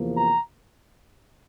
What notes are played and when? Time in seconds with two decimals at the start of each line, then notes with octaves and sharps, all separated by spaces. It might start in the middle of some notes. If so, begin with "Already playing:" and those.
Already playing: E2 C3 F3 A#3
0.16 A#5